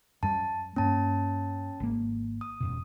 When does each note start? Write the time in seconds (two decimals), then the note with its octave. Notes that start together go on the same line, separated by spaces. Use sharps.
0.23 F#2 G3 A5
0.76 G2 A#3 C#4 A5
1.80 G#1 A#3
2.41 D#6
2.60 E1 F#2 B2